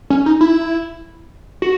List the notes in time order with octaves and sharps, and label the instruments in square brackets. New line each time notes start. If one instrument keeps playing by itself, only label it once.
[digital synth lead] C#4
D#4
E4
F#4